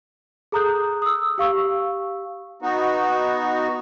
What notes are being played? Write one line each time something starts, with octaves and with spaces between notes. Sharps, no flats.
G#4 A4 A#5 D#6 F#6 G6
D#6 E6
G4 F5 C#6 E6
B3 D#4 F#4